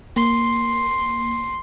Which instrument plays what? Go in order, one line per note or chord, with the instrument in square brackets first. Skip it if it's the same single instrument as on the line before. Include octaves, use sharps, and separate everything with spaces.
[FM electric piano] A#3 [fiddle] C6